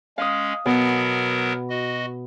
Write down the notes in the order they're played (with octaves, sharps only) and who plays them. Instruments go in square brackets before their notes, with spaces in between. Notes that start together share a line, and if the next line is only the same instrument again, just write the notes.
[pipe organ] G#3 C#4 [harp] F5 D#6
[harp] B2 [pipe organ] F#3 B3 A#4
[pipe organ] F#4 D#5